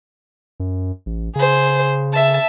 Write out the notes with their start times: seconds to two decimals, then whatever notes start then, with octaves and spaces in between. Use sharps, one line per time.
0.60 F#2
1.06 A1
1.36 C#3 G#4 C5
2.13 E5 A5